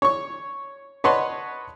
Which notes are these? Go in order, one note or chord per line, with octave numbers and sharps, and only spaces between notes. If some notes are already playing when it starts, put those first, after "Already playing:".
C#5 C#6
B4 C#5 D#5 F#5 A5 C6